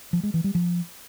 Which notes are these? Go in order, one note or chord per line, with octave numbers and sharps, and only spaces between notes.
F3
G#3
E3
G3
F3